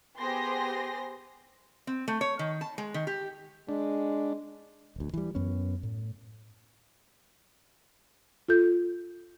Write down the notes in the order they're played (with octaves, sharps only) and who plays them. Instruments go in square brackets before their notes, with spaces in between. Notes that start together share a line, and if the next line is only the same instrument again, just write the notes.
[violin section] B3 G4 G#4 C5 C6 A#6
[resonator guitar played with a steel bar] C4
A3
C#5
D#3
A5
G#3
D#3
G4
[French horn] G#3 [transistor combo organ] D4
[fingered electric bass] D1 D2
E3 G3
F#2 B3 C#4
A2
[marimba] F4 A4 G6